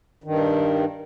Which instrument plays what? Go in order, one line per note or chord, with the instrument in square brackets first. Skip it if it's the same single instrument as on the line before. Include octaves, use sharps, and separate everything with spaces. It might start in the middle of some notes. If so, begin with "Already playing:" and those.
[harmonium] G2 D#3